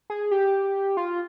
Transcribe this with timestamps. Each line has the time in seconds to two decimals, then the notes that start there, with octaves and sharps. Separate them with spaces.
0.10 G#4
0.31 G4
0.97 F4